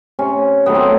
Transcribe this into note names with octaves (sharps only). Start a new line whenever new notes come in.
C3 C#4
D#3 F#3 A3 B3
C4